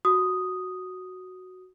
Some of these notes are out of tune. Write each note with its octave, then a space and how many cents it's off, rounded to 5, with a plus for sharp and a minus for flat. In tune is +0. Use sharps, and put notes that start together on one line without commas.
F#4 +0 D#6 +0